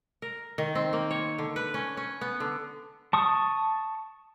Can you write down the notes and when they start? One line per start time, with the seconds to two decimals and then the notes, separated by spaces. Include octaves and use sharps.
0.22 A#4
0.58 D#3
0.75 C4
0.93 A#3
1.11 C#5
1.38 D3
1.56 B4
1.74 C#4
1.97 C#4
2.21 B3
2.40 D3
3.13 A5 C#6 D#6